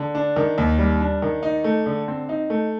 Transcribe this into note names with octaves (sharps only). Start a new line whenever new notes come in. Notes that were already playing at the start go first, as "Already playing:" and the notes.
Already playing: D3
D4
D#3
D#2
G3
D4
D#3
D#4
A3
D3
C4
D#4
A3